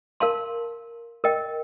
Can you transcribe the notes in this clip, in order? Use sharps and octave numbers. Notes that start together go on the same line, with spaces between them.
A#4 F5 A5 C6
A#4 D#5 G5